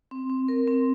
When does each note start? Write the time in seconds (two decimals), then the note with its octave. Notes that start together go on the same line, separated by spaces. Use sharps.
0.11 C4
0.30 C4
0.48 A#4
0.68 C4